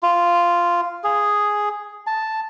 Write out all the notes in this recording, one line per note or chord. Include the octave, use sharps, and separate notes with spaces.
F4
G#4
A5